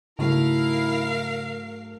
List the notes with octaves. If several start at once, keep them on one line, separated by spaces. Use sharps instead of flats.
G#2 C#3 F#3 A3 E4 A#4 F5